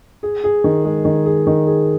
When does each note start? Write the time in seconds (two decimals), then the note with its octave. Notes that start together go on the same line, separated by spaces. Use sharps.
0.23 G#4
0.44 G#4
0.64 D#3
0.85 G#3
1.05 D#3
1.26 G#4
1.47 D#3
1.67 G#4